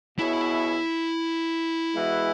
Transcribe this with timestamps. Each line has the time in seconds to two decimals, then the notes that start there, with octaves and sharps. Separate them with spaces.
0.18 B2 B3 E4 G#4 C#5 E5
1.94 E3 G#3 B3 F#4 E5